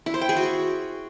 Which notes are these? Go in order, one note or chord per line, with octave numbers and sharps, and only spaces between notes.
E4
C5
G5
G#4
F#4